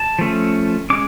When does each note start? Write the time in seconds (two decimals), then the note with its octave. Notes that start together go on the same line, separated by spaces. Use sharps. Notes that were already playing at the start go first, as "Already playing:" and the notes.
Already playing: A5
0.19 F3 A3 C#4
0.90 G#3 C#4 D6